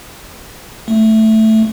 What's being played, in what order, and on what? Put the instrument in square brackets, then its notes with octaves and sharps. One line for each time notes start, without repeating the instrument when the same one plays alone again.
[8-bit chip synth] A3